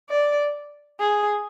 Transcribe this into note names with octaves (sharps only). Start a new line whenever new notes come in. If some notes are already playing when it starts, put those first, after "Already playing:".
D5
G#4